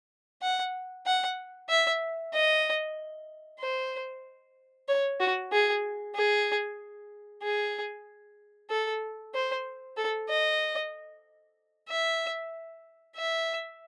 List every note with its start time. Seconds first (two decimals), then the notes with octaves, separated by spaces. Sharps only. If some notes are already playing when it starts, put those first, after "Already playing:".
0.42 F#5
1.06 F#5
1.70 E5
2.34 D#5
3.60 C5
4.89 C#5
5.20 F#4
5.52 G#4
6.15 G#4
7.43 G#4
8.70 A4
9.34 C5
9.97 A4
10.29 D#5
11.90 E5
13.17 E5